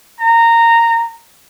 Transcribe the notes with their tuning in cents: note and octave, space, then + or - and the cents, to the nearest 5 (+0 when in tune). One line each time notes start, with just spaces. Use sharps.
A#5 -15